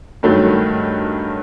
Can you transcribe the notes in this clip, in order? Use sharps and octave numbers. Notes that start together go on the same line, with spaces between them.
G2 D#3 F#3 A3